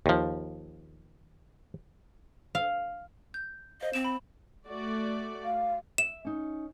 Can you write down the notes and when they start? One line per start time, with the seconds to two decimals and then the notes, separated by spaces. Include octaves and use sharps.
0.06 D#2 F3
2.55 F5
3.34 G6
3.81 C5 D#5 F5
3.93 C4 E7
4.04 B5
4.67 A3 F#4 D5
5.44 F5
5.98 E5 E7
6.25 C#4 D#4